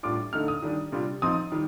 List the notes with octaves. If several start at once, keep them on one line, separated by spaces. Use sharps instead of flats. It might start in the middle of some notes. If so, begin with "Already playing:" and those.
A2 G3 D4 F4 D6
D3 A3 D#4 F6
D#6
D#3 G3 D4
C3 G3 D4 F4
F3 C4 D#4 D#6
D#3 G3